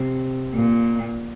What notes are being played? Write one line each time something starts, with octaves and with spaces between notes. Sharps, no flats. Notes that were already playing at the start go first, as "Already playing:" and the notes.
Already playing: C3
A#2